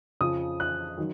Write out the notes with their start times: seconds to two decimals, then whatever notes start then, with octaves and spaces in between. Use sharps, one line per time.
0.21 F2 C#3 F3 D#6
0.60 F#6
0.98 D#3 F#3